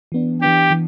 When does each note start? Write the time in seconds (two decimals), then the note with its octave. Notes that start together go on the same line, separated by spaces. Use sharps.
0.12 E3 B3 D4
0.41 E3 B3 D4 G4
0.71 E3